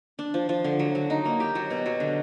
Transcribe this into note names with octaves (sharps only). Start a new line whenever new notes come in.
D4
F3
F3
D3
F#3
F#3
D#4
A#3
G4
F#3
B2
F#3
D3